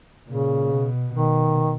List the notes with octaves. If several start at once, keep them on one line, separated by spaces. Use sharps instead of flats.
A#2 C#3
B2
B2 D#3